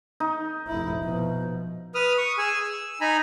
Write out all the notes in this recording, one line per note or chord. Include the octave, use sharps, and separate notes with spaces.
D#4
F1 E4
B2 F3
B4 D#6 F6
C#6 D#6
G#4 G#5 E6
E6
D#4 G#5 A#5 B5